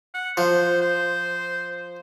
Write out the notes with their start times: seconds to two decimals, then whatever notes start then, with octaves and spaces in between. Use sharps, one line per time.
0.15 F#5
0.37 F3 C5
0.81 C5